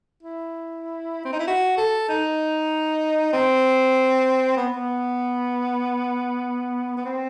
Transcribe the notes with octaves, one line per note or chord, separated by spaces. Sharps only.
E4
C4
D#4
E4
F#4
A4
D#4
C4
B3
B3
B3
C4